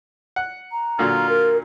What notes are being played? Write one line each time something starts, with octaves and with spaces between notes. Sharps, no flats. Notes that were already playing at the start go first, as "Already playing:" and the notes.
F#5
A#5
A#2 D3 F#3 F4
A#4